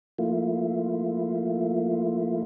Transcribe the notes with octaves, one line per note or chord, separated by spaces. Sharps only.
F3 A3 A#3 E4 F4